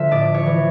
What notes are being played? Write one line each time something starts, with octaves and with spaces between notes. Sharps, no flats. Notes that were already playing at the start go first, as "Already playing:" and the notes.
Already playing: D3 F3 A3 E5
A2 D5
C#5
E3